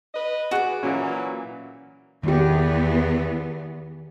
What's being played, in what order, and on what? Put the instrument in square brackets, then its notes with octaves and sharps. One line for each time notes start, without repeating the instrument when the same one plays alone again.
[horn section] B4 D#5
[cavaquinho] F#4 D5 [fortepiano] G#4 F#6
[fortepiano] A#2 C#4 [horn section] E3 F#3 A#3
[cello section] E2 B3 [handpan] D#3 G4